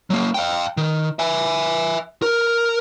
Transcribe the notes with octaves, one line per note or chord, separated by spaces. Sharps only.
F#3 A#3
F5 G5
D#3
E5 G#5
A#4